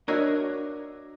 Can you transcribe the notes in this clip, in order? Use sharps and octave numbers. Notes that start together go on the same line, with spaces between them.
D4 F#4 A#4 C#5 D#5 E5